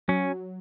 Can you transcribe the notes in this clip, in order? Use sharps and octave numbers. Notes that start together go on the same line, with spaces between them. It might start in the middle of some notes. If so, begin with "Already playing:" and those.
F#3 C#4